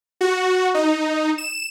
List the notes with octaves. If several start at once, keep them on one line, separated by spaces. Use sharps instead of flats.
F#4
D#4
E7